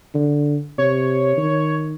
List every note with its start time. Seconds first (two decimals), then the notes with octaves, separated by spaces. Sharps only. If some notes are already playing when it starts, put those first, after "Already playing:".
0.15 D3
0.78 C3 C#5
1.37 D#3